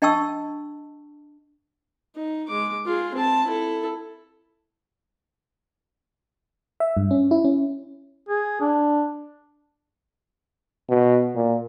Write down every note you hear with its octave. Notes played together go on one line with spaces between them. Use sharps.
D4 D#5 G5 A5 C#6 E6
D#4
G#3 D6
F4 G#4
C4 A5
E4 A4
E5
G2
C#4
E4
C#4
G#4
D4
B2
A#2